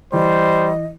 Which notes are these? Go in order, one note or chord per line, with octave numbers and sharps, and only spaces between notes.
E3 G3 C5 D#5